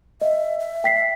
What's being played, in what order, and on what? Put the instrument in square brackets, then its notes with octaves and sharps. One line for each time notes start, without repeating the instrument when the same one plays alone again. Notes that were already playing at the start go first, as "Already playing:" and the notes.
[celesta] D#5 [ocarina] E5
[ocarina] E5
[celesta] G5 B6 C7